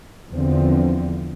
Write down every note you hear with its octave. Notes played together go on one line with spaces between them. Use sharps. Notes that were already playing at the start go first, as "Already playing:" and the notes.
E2 D3 F3 C4